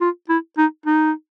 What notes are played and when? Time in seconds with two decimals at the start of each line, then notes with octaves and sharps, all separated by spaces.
0.01 F4
0.29 E4
0.58 D#4
0.86 D#4